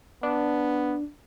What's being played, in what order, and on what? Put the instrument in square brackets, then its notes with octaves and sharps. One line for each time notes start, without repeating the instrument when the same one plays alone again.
[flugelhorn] B3 [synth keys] D4